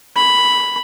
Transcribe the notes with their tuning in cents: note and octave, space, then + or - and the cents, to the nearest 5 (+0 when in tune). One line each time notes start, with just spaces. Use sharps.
B5 +0